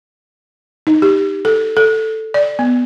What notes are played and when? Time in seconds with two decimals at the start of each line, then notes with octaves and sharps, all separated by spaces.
0.87 D#4
1.02 G4
1.45 A4
1.77 A4
2.34 D5
2.59 B3